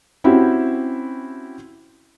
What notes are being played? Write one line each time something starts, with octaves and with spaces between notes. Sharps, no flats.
C4 C#4 E4 F#4 G4